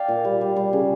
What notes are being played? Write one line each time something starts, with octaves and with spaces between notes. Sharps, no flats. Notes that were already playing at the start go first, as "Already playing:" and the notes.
Already playing: D5 F5 G5
A#2
G3
G3
G3
C#3